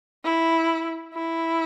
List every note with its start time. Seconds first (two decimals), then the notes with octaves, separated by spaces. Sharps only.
0.24 E4
1.15 E4